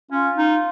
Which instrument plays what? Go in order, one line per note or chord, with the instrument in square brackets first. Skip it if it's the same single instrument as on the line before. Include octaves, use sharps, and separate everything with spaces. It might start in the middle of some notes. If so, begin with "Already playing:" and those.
[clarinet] C#4 [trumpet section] F4
[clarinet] D#4